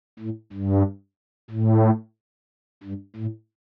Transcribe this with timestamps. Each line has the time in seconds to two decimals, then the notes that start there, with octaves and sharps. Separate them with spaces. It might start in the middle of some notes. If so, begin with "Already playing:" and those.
0.19 A2
0.53 G2
1.51 A2
2.83 G2
3.16 A2